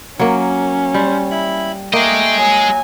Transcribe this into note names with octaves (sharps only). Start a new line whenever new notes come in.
F#3 A#3 C#4
G3 C5
E4 B5
A3 A#3 G#4 D#5 G5
F#3 G#5